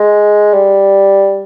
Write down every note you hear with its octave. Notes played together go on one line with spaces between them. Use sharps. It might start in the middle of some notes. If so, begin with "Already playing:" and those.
Already playing: G#3
G3